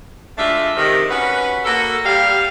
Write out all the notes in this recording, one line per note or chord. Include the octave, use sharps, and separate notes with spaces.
G#3 A3 D4 F4 E5
C3 D#3
C#4 F#4 B4
A#3 F#4 A4
G3 F5